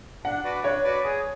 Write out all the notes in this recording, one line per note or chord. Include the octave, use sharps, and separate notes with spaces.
D4 F#5
F#4 B4 D5
D4 C#5
F#4 B4 D5
G#4